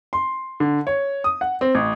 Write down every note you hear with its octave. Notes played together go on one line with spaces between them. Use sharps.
C6
D3
C#5
D#6
F#5
C4
A1